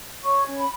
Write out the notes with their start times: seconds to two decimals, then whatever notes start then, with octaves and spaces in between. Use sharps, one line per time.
0.23 C#5 C#6
0.45 C#4
0.56 B5